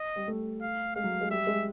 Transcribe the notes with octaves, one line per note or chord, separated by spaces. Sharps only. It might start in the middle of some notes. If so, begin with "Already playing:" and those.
Already playing: D#5
G3
A3
F5
G#3 F5
F#3
G#3
G3 E5
G#3